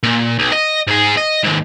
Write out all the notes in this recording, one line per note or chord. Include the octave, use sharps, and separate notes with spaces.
A#2
B1
D#5
G#2 G#4
D#5
D#2 G#2